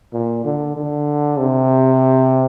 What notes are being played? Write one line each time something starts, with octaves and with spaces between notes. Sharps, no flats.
A#2
D3
D3
C3